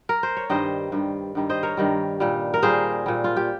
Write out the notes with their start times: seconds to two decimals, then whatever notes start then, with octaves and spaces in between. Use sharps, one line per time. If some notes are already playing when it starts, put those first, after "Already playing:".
Already playing: G#4
0.09 A#4
0.23 C5
0.37 C#5
0.50 G2 D#3 G3 C5 D#5
0.92 G2 D#3 G3
1.35 G2 D#3 G3
1.49 C5 D#5
1.63 A#4 C#5
1.77 G2 D#3 G3
2.20 A#2 G3
2.54 A#4
2.63 A#2 G3 G#4 C5
3.06 A#2 G3
3.24 F4
3.36 G4